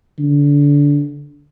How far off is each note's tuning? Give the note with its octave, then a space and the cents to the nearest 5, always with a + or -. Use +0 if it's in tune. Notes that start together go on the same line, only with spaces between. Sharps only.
D3 -25